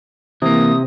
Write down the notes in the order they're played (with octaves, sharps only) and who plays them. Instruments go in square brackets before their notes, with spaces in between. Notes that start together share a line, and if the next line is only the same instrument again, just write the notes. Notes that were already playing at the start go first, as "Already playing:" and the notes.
[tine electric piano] C3 [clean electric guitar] E3 A#3 [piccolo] D#6